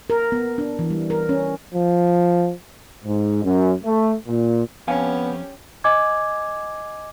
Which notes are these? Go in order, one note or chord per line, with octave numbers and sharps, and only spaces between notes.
A#4
B3
D4
E3
G3
A#4
C#4
F3
G#2
F#2
A3
A#2
F2 B3 C#4 G4 F5 G#5
D#5 G#5 D6 G#6